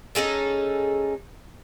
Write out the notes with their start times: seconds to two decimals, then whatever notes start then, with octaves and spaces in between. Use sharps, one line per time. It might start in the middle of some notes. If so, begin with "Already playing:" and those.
0.15 C#4 D#4 G#4 A4